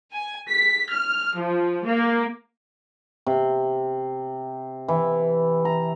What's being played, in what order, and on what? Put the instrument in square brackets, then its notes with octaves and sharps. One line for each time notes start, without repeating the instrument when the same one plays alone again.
[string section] G#5
B6
F6
F3
A#3
[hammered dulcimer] C3
E3
A#5